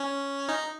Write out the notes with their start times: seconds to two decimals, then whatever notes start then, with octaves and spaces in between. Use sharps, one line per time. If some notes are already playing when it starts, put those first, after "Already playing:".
Already playing: C#4
0.49 D#4